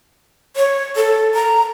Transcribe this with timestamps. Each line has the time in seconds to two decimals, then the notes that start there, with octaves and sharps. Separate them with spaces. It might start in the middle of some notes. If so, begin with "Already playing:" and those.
0.56 C#5
0.96 A4
1.34 A#5